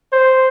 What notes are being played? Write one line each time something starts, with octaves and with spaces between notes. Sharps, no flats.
C5